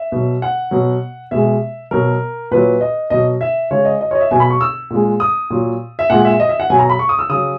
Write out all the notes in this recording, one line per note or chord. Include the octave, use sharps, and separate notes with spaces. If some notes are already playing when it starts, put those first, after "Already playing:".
Already playing: E5
B2 F#3
F#5
B2 F#3
B2 G#3 E5
B2 F#3 A#4
A#2 F#3 B4
D#5
B2 F#3 D#5
E5
C#3 G#3 C#5
D#5
D#5
C#5
D#5
E5
B2 F#3 G#5
B5
C#6
E6
A#2 G#3
D#6
A#2 F#3
E5
A#2 G#3 F#5
E5
D#5
E5
F#5
B2 F#3 G#5
A#5
B5
C#6
D#6
E6
C#3 F#3 D#6